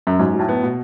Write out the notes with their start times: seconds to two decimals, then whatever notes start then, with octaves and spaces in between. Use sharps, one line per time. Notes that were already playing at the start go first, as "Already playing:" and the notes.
0.07 F#2
0.19 G#2 F#3
0.33 F#3
0.39 A2
0.48 B3
0.63 B2